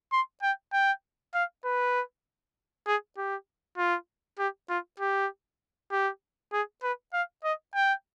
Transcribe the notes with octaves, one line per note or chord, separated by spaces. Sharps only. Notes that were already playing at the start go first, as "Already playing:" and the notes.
C6
G5
G5
F5
B4
G#4
G4
F4
G4
F4
G4
G4
G#4
B4
F5
D#5
G5